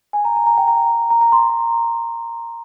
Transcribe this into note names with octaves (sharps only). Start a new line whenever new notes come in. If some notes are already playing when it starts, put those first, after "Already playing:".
G#5
A#5
A#5
A#5
G5
A#5
A#5
A#5
C6